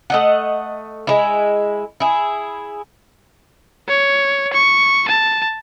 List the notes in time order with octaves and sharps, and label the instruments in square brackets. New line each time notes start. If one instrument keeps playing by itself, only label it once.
[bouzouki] A3 D#5 F#5
G#3 E4
E4 G#4
[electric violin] C#5
C#6
A5